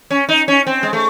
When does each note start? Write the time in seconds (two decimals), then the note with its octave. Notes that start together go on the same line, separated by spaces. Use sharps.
0.11 C#4
0.29 D#4
0.48 C#4
0.67 C4
0.83 G#3
0.93 A3